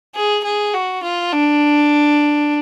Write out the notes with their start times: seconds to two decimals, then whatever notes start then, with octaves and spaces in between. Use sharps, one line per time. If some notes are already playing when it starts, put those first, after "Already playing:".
0.15 G#4
0.45 G#4
0.74 F#4
1.03 F4
1.32 D4